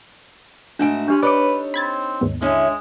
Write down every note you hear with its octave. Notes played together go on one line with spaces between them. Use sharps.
G#2 A3 D4 F#4 G#5
C#4 D4 G4 C6
D#4 A4 B4 C#5 D5 D6
C4 B5 G#6 A6
D#2 G#2 B3
D3 G#3 C#4 E4